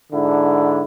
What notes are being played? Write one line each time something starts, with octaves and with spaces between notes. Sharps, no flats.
G#2 D3 D4 E4